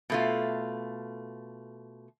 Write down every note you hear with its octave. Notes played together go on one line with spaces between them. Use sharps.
B2 A3 F4